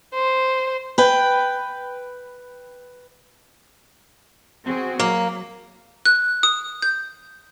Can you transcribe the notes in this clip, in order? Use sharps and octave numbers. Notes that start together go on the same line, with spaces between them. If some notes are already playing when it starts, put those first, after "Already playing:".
C5
B4 G5
C4 F#4 G#4
F#3 A#3
F#6
D#6
G6